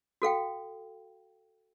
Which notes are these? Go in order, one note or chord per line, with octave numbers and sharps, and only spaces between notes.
F#4 A4 F5 G5